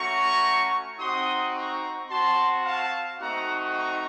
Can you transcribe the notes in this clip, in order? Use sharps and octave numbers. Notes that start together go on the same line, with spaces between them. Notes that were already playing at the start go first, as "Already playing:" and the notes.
Already playing: A3 C#4 F#4 A#5 C#6
C4 D#4 F#4 C6 D#6
A#5 C#6
C4 F#4 A5 C6
F5 A5
A3 C4 D#4 F#4 F#5 A#5
A#5 C#6